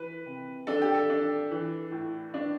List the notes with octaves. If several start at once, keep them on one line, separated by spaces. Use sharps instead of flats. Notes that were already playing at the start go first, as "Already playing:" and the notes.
Already playing: E3 B4
C3
D4 A4
G4
A4
D4
E3
A2
D4